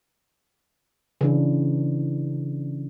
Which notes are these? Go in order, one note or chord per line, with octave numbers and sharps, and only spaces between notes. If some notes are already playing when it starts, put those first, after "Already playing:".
C#3 E3 D4